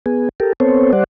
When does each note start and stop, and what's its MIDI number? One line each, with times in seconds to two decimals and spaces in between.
0.06 0.29 59
0.06 0.29 68
0.40 0.53 67
0.40 0.53 69
0.40 0.53 70
0.60 0.93 59
0.60 0.93 60
0.60 0.93 69
0.60 0.93 72
0.60 0.93 73
0.93 1.04 55
0.93 1.04 72
0.93 1.04 74
0.93 1.04 78